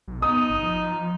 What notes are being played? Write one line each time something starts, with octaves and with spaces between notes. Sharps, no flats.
B1
B3 D#4 D#6
G1
F3